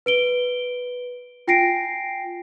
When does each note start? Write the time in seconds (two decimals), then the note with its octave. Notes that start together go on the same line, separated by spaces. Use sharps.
0.06 B4 D7 G7
1.48 F4 G5 G#5 A#6 C7 D7